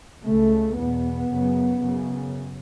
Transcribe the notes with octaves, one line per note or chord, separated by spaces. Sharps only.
C#2 C#3 A3
E2 B2 B3
F#2 C#3
F#2 C#3